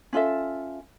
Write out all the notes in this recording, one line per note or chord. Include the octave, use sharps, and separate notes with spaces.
C#4 F4 A4 E5